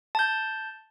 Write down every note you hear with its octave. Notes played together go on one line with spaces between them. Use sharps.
A5 G6